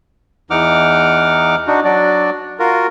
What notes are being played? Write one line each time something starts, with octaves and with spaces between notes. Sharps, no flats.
E2 E3 D#4 F#5 D6 F6
D4 D#4 F#4
F#3 D4 F#4 D5
F4 F#4 A#4